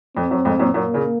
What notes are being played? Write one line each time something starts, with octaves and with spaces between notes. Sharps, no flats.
F2 C4
F#2
F2 G#2
F#2 A#2
F#2 A#2 A#3
A#2 C#3